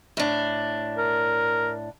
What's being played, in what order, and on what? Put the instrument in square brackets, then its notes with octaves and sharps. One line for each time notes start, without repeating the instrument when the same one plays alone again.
[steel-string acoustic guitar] A2 D4
[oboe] A#4